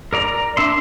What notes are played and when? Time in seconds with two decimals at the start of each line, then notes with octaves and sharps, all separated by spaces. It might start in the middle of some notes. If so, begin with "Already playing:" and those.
0.13 A#4 D5 A#5
0.57 D4 E5 C6